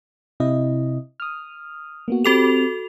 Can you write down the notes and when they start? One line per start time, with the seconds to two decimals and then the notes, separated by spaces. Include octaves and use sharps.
0.40 C3 E4 D#5
1.20 D#6 F6
2.08 A#3 B3 F#4
2.24 C4 F#4 G4 A4 F7